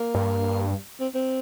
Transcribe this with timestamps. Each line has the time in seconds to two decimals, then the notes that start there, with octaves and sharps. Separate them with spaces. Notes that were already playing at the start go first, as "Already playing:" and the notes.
Already playing: A#3
0.15 G2
1.00 C4
1.15 C4